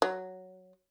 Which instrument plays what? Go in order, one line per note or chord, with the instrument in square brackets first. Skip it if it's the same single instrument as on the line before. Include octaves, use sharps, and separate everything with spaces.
[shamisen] F#3